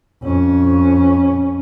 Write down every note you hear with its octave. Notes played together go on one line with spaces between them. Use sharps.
F2 C#4